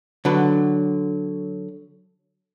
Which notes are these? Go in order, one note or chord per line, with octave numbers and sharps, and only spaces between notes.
D3 F#3 B4